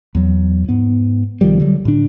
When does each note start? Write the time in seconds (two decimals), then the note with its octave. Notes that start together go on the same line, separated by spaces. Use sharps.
0.15 E2 F#3
0.69 G#2 B3
1.41 B1 D#3 F3 G3
1.60 D3 F#3 G3
1.85 A2 D3 D4